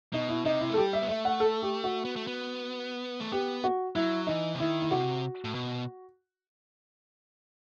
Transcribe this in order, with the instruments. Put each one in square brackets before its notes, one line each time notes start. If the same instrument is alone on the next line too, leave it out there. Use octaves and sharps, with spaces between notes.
[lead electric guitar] B2 [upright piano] D#4
[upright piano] E4
[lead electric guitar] C3 [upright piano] D#4
[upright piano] E4
[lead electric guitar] A3
[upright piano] A4
[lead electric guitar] G3 [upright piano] G4
[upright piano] E5
[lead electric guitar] B3
[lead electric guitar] A3 [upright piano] E5
[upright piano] F#5
A4
G4
F#4
[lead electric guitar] B3
A3
B3
A3
[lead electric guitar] B3 [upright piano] G4
[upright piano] F#4
[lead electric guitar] F#3 [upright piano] E4
[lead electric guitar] E3 [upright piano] D#4
[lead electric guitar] C3
[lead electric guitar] D#3 [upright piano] E4
[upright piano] E4
[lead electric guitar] C3 [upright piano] F#4
[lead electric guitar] A2
B2